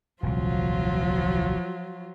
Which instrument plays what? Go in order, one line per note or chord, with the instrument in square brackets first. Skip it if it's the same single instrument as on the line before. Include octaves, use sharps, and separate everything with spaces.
[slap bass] D#1 C2 [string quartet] F3 F#3 F4